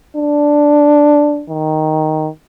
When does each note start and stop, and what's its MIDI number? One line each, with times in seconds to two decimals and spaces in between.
0.17 1.44 62
1.50 2.28 51